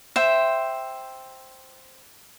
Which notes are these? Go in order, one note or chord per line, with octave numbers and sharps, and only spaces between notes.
C5 E5 G5